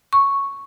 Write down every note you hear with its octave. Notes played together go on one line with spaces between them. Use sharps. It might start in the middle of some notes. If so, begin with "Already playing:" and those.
C#6